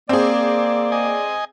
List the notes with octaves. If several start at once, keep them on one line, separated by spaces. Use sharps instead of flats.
A#3 C4 G#4 D5
D#5 G#5